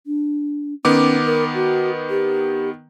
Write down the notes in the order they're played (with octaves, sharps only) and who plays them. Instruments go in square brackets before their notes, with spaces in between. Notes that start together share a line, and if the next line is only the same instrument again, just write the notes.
[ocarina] D4
[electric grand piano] D#3 B3 D6 [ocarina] C#4
[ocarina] A#4
F#4
G4